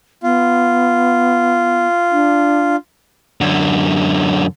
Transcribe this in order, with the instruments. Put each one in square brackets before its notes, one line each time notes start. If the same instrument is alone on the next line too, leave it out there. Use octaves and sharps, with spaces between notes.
[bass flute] B3 [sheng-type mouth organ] F4
[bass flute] D4
[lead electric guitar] F#2 D3